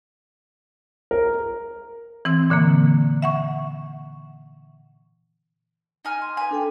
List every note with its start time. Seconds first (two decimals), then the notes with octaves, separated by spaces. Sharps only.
1.11 A#4
2.25 E3 C4 E6
2.50 A#2 D3 E3 A#3
3.22 E5 F#5 C#6
6.05 D#4 G#5 F6
6.22 C6
6.37 B4 G#5
6.51 D4 A4 G5